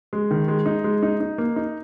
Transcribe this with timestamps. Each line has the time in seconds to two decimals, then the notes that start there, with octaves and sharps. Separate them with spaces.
0.13 G#3
0.31 D#3
0.48 G#3
0.66 D#4
0.84 G#3
1.03 D#4
1.20 D#4
1.38 A#3
1.56 D#4